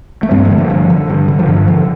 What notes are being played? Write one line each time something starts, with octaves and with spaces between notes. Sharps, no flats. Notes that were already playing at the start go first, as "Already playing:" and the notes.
A3
G2 G3 C4
F3 A3
D3 G3
F3
G2
D3
G2
D3
F3
G2 D3
D3 F3